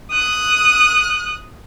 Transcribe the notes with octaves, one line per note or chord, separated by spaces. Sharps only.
D#6 F#6